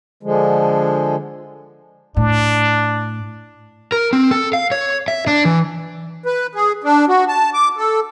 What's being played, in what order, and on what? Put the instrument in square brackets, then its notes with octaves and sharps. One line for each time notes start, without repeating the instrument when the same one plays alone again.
[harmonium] D3 F3 G#3
[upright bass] A2 [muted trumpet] D4
[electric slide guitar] A#4
C4
A4
F5
C#5
E5
D4
E3
[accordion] B4
G#4
D4
F#4
A5
D6
A4